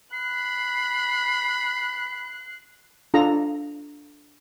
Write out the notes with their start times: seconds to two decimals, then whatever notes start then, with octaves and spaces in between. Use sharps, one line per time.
0.12 B5 F#6 C7
3.14 D4 F4 A4 A#5